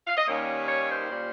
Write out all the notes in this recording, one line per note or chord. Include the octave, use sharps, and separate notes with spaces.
F5
D#5
D#2 D#3 G3 A#3 C#4 C#5
C#5
C5
A#2 G3 C#4